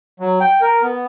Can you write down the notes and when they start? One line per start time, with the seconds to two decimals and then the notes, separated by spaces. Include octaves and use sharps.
0.20 F#3
0.40 G5
0.61 A#4
0.82 B3